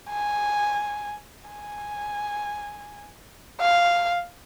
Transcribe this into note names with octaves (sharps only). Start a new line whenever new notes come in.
G#5
G#5
F5